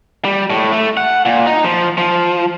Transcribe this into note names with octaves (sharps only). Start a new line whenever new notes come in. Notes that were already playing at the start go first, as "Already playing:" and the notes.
G3
A2
A3
F#5
A#2
D#4
F3
F3